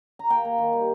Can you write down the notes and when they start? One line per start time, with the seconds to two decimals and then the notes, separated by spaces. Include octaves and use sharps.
0.19 A#5
0.30 A#3 G5
0.45 A#3
0.58 D#3
0.73 G3